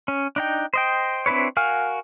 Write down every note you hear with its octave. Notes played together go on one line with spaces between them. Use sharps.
C#4
D4 D#4 G5
C5 D#5 G5
C4 D4 E4 B4 C#5
F#4 A#4 F5 G#5 F6